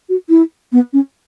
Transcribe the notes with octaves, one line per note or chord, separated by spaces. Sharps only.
F#4
E4
B3
C#4